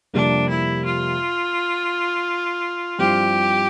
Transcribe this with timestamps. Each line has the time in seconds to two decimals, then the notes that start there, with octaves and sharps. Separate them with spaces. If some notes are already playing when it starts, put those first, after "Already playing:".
0.14 F2 C3 G3 A#3 D4
0.49 E4
0.85 F4
2.99 G2 F3 C4 E4 G4